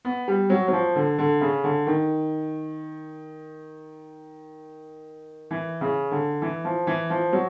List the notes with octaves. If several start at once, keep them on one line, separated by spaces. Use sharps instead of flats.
B3
G3
F#3
F#3
F3
D3
D3
C#3
D3
D#3
E3
C#3
D3
E3
F3
E3
F3
F#3